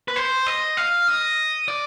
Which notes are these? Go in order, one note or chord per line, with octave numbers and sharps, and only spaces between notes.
B4
C5
D#5
F5
D#5
D5